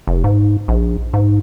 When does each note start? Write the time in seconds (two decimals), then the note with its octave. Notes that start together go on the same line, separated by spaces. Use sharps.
0.07 F1
0.24 G#2
0.68 A#1
1.14 G#2